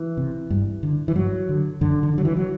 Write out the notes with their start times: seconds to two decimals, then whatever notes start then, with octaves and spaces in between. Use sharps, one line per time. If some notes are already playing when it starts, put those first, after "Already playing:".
Already playing: E3
0.17 C3
0.50 G2
0.83 D3
1.08 E3
1.15 G2 F#3
1.49 D3
1.81 F#2 D3
2.03 D3
2.13 D3 F#3
2.25 E3
2.37 F#3